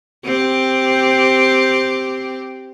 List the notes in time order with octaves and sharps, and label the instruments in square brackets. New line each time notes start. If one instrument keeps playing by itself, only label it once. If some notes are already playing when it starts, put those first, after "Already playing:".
[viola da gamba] C4 G4